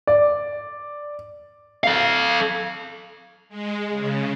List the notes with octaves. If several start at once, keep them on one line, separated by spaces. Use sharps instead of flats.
D5
A4 F5
G#3
C#3